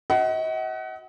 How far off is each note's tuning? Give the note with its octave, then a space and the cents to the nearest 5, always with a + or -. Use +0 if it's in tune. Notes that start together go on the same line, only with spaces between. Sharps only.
F#4 -5 D#5 +40 F#5 +25